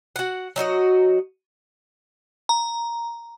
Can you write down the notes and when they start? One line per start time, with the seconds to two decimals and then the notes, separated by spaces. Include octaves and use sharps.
0.16 F#4 F#5
0.56 F#3 D#4 F#4 D#5
2.49 A#5